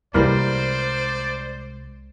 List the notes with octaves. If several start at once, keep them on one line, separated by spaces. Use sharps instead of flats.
C2 E3 G3 G#3 A#3 C5 D5